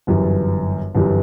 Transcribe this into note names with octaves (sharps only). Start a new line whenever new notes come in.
G1 F#2 E3 G3
G1 F#2 E3 G3